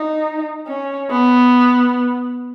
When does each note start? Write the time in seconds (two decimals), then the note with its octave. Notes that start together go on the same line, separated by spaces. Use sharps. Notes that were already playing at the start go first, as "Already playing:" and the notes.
Already playing: D#4
0.67 C#4
1.11 B3